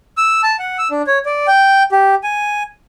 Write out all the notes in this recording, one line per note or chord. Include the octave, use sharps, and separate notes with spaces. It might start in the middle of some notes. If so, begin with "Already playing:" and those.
E6
A5
F#5
E6
D4
C#5
D5
G5
G4
G#5